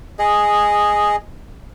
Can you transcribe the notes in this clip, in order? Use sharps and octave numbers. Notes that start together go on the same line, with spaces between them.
G#4 D#5